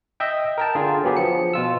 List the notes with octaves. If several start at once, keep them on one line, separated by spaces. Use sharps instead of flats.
D#5 E5 G5
A#4 G5 A5
D3 F4 G#4
F#3 B3 G4 G#4
F3 C#7
B2 F4 E6